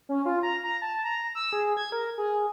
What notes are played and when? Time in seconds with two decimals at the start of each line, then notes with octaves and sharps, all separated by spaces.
0.09 C#4
0.25 F4
0.43 A#5
0.63 A#5
0.82 A5
1.04 A#5
1.35 E6
1.53 G#4
1.77 G#6
1.92 A#4
2.18 G#4